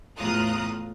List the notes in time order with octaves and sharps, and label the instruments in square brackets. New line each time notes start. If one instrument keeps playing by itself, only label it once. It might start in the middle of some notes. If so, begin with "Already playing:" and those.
[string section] E2 A2 F4 A#5 D#6 F#6